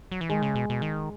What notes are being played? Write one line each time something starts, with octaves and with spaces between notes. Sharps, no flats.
F#3
E3
D#3 G#3
C#3
B2
B2
D#3